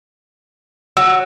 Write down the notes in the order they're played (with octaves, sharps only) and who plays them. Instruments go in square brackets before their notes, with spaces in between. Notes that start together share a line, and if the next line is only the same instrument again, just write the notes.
[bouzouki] F#3 [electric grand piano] E6